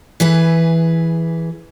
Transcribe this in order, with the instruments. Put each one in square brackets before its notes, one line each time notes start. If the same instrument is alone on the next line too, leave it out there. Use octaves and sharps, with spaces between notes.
[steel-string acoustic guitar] E3 G#4 B4